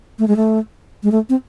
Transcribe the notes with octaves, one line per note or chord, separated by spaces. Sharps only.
A3
G#3
A3
G#3
A3
C4